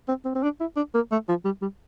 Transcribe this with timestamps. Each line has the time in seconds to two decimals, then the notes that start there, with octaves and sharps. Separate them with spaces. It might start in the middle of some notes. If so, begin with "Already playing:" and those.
0.08 C4
0.25 C4
0.35 C4
0.43 D4
0.60 E4
0.76 D4
0.94 A#3
1.11 A3
1.28 F3
1.45 G3
1.62 G3